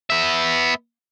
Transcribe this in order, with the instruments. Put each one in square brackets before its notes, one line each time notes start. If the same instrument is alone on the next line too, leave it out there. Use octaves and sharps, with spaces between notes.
[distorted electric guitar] B3 E5